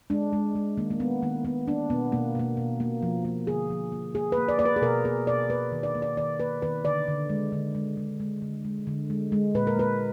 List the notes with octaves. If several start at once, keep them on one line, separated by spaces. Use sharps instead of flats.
G#3 D4
G#3
G#3
D#3 A#3
A#3
G#3 B3
D#3 A#3
A#3 B3
A#3 D4
B2 B3
B2 A#3
B2 A#3
B2
A#3
F3
A#3
D3 G#4
F3
A#3
A#3 G#4
B4
A#3
D5
A#3 D5
B4
G#4
B2 A#4
A#3 G#4
B2 D5
A#3 B4
D#3
D5
A#3
D5
D#3 D5
A#3 B4
D#3 B4
D3 D5
D3
G#3
D3
G#3
G#3
G#3
D3
G#3
D3
G#3
G#3
A#2 B4
A#4
A#3 B4